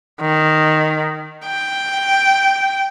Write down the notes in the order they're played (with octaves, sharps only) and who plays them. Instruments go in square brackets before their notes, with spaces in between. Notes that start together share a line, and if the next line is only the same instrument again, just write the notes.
[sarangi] D#3
G5